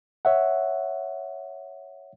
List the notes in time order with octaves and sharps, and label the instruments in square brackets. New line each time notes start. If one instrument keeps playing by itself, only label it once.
[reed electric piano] C#5 E5 F#5